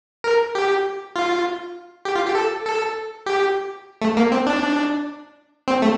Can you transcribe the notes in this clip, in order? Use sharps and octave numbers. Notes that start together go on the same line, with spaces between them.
A#4
G4
F4
G4
F4
G4
A4
A4
G4
A3
A#3
C4
D4
C4
A3